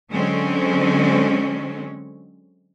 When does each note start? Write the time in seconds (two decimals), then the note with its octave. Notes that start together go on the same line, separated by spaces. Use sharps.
0.10 D3 F#3 G#3 C4 C#4